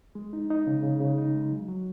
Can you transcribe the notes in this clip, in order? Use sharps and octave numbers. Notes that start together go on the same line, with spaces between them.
G#3
D#4
D#4
C#3
C#3
C#3
D#4
G#3
F#3
F#3